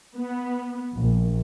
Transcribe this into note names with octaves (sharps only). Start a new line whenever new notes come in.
B3
A#1